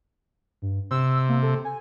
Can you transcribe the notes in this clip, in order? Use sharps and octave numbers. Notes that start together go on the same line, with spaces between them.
G2
C3 E6
A#3
A4
G#5